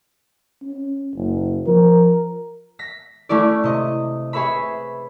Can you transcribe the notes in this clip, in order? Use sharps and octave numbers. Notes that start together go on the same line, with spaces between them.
C#4
F#1
F3 A#4
A#6 B6
A3 C#4 E4 D5
C3 D#5
G#4 B4 C#5 E5 B5